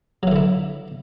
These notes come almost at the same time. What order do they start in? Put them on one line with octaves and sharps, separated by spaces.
F#3 E3 D3 E4